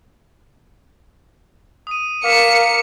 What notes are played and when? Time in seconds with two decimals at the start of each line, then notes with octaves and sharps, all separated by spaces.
1.87 D#6 D#7
2.24 A#4 F5 D6 B6 C#7 E7